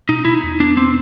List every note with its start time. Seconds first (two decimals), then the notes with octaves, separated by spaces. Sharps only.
0.09 B2 D#4
0.25 B2 E4
0.34 D#4
0.44 E2
0.60 B3 D4
0.77 B3 C4